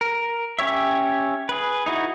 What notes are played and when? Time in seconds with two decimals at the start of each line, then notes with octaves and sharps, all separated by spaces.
0.01 A#4
0.59 C#4 G4 C#5 E5
1.49 G#4 B4
1.86 D#4 E4 F#4